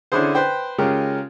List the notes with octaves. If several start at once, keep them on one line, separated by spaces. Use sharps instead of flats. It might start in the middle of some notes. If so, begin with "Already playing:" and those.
D3 C#4 D4 E4 G#4 C5
B4 C5 G5
C#3 G#3 C#4 F4 G4 A#4